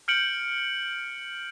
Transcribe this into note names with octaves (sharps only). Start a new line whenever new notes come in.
F6 G6 C#7 D7 F#7